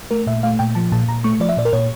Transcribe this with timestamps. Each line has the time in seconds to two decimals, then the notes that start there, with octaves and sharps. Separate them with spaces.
0.11 A3 A#4
0.27 A#2 E5
0.43 A3 F5
0.59 A#2 G5
0.75 F3 A5
0.92 A#2 A5
1.08 A#2 A#5
1.24 A3 C#6
1.40 F3 D5
1.49 E5
1.57 A#2 D5
1.65 A#4
1.73 A#2 C#5